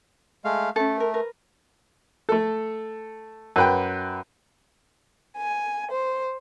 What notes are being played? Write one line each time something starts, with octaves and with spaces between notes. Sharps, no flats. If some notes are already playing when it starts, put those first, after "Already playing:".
G#3 A3 F5
A3 C#4 A4
A#4
A#4 B4
A3 A4
F#2 B4 G5
G#5
C5